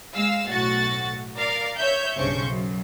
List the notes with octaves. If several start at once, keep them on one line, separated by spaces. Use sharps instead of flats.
G#3 F5 E6
B1 A2 F#4 A6
A#4 D5 F5
C#5 E5 G6
B1 G2 C#3 C5 C#6 G6
F#2